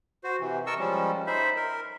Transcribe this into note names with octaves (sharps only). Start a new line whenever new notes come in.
F#4 C5
C3 E3
A#4 D#5 A5 C#6 E6
F3 G3 G#3 C#4
D#4 C5 E5 B5
A#4